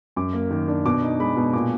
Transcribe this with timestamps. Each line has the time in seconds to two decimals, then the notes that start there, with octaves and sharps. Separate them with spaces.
0.16 F#2 D6
0.33 A#3
0.51 D#3
0.68 D4
0.85 B2 D6
1.03 D#4
1.20 G#3 B5
1.37 B2
1.53 A#2 D6